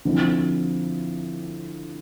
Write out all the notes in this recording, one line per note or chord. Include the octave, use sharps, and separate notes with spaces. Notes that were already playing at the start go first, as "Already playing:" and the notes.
D3 F3 C4 E4